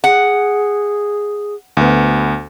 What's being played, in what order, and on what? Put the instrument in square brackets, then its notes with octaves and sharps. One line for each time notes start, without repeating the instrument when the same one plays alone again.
[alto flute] G#4 [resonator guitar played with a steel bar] F#5
[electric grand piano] D2 B3